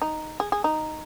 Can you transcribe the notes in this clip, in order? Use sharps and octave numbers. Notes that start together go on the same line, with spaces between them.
D#4
G#4
G#4
D#4